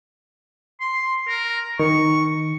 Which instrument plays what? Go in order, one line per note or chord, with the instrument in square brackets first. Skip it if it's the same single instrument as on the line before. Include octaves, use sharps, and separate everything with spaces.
[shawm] C6
A#4
[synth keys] D#3 [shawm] C#6